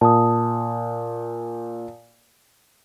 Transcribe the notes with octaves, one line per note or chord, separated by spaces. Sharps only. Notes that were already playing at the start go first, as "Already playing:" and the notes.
A#2 A5 D#6